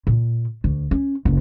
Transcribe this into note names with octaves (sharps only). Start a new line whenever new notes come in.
A#2
D2
C#4
F#1